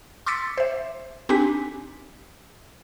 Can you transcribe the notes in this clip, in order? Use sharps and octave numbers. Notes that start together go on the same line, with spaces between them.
C6 D6 E6 A6 B6 C#7
C5 E5
C4 D4 D#4 G4 G#5 B6